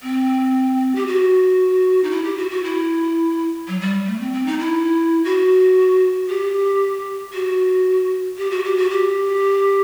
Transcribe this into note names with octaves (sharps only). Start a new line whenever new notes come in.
C4
G4
F#4
D#4
E4
G4
F#4
F#4
E4
F#3
G3
A3
C4
C4
D#4
E4
F#4
G4
F#4
G4
F#4
G4
F#4
G4